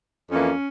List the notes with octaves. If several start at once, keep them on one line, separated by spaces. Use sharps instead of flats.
F2 E3 A#3 C#4